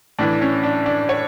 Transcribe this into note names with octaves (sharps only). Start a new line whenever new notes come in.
A2 E3 D4
C#4
D4
D4
C#5